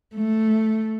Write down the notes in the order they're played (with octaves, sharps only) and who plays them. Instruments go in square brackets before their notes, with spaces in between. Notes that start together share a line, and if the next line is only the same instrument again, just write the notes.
[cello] A3